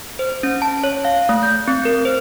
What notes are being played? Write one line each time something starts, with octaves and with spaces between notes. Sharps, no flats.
C5
C#4
A5
C#5
F5
A3
G6
C4
A#4
C5